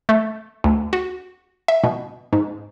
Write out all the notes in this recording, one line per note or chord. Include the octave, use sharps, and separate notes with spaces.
A3
D2
F#4
E5
B2
G#2